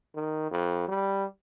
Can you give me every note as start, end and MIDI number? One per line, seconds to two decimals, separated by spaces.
0.15 0.50 51
0.51 0.84 41
0.88 1.24 55